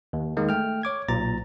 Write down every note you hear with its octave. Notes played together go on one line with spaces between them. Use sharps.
D#2
D#3 G#3 A#3
A3 G5 F6
C#5 D6 G#6
B1 A#2 A#5 A6